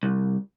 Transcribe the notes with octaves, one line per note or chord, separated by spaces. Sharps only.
C2